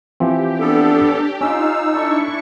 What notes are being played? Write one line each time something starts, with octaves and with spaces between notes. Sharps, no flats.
E3 F3 C4 G4
B3 D4 A4
C#4 D#4 F4 F5 E6
D4 E4 A4 C#6